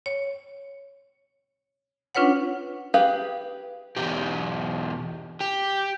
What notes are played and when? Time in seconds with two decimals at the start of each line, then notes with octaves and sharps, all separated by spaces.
0.06 C#5
2.15 C#4 D4 F4 B4 C#5 F#5
2.94 G4 G#4 B4 F5
3.96 E2 B2 G4
5.41 G4